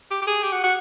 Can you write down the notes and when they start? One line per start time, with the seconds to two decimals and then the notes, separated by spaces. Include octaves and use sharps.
0.11 G4
0.22 G4
0.27 G#4
0.43 G4
0.52 F#4
0.64 F#4